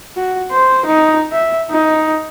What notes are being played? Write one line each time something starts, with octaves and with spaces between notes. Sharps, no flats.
F#4
C5
D#4
E5
D#4